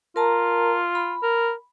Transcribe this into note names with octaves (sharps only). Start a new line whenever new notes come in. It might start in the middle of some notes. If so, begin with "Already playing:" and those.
F4 A#4 A5 A#5
B5
A#4